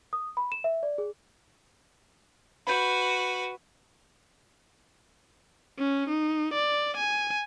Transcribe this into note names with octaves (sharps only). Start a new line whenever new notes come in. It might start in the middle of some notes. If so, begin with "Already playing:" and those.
D#6
B5
E7
E5
D5
G#4
F#4 B4 B5 G6
C#4
D#4
D5
G#5